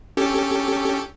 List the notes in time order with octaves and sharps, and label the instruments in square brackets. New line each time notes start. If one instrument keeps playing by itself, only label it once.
[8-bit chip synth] C#4 G4 A4